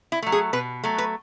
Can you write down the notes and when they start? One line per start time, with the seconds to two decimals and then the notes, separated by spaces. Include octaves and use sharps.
0.12 E4
0.22 F#3 A3
0.32 G#4
0.53 B2 B4
0.84 F#3 A3
0.98 B4